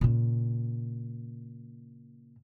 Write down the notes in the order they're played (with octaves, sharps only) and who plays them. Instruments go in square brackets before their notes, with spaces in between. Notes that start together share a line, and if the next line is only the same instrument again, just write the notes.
[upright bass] A#2 C#3